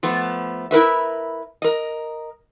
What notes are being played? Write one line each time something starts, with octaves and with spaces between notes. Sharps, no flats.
F3 A3 B3
E4 A#4 B4 E5
A#4 D#5